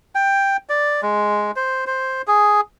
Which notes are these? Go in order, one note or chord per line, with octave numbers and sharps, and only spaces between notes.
G5
D5
G#3
C5
C5
G#4